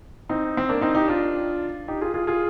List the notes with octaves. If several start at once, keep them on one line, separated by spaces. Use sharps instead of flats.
C4 D#4
C4
A#3 D4
C4 D#4
D#4 G4
D4 F4
D#4 G4
F4 G#4
F4 G#4
F4 G#4